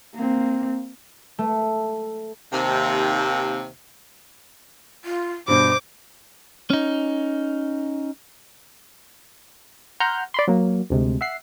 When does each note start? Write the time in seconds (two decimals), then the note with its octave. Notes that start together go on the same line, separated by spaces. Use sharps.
0.15 A#3 C4
1.39 A3
2.53 D#2 C3
5.05 F4
5.48 G2 B2 C5 D6
6.70 C#4 D#4
10.00 F#5 A#5 C6 F6 G6
10.34 D5 B5 C6
10.47 F#3 A#3
10.90 D2 C3 G#3
11.21 E5 F#5 C7